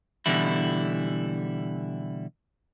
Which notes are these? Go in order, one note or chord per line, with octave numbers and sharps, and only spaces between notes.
B2 D3 E3 G3 E4